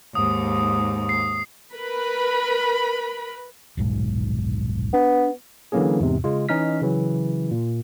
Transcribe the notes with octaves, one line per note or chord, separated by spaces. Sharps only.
D#2 G#2 D#6
C7
A#4 B4 B5
D#1 B1 G#2
B3 D4
D3 E3 F#3 A#3 C#4 G#4
E2 G#2 C3
C#3 G#3 F4
E3 C#4 D#4 D#5 F6 B6
C#3 E3 F#3
A#2